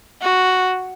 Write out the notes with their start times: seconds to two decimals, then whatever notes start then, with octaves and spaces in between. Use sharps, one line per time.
0.22 F#4